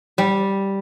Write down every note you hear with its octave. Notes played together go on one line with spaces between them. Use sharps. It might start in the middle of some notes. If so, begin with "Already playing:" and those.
G3